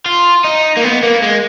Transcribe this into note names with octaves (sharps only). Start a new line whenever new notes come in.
F4
D#4
A#3
B3
A#3
G#3